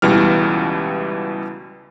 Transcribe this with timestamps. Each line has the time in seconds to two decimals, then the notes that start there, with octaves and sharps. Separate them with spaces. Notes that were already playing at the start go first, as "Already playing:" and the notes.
0.02 C#2 B2 E3 G3 F6